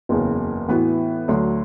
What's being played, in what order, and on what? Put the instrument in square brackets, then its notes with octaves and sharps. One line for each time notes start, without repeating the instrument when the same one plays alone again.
[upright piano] F#1 E2 C#3
A2 E3 B3 F#4 B4
D2 D3 F#3